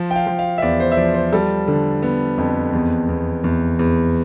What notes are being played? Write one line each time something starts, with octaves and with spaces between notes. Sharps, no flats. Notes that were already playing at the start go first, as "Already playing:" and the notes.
Already playing: F3
G5
F5
F3
F5
E5
E2 D5
C5
E5
F3 D5
C5
G3 A4
D3
B3
F2
E2
E2
E2
E2